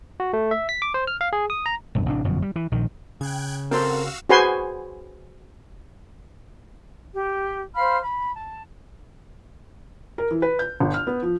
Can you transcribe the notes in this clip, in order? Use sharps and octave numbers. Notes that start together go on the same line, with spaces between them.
F#4
A3
E5
B6
D6
C5
F6
F5
G#4
D#6
A#5
E1 G2
A1 C3 D4
G1 F#2 B2 F3
G3
E3
A#1 D#3
C#3 G5 F#6 G#6
C4 F#4 A4 A#4 C5 F5 E6
F#4 G#4 B4 C5 G#5 C6
G4
C5 F5 B5 F6
B5
A5
A#4
E3
B4
G6
G1
F6
B3
F3